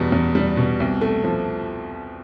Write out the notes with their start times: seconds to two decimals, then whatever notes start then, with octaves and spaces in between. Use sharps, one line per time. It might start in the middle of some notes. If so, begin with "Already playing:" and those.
Already playing: E2 B2 G3
0.12 E2
0.35 G3
0.57 B2
0.80 C2
1.01 A3
1.24 F3